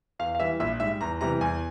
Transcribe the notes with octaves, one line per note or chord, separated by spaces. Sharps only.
E2 F5
F5
E3 G3 E5
A#1 E5
G#2 G3 E5
E2 A#5
C3 E3 G3 A#5
E2 G#5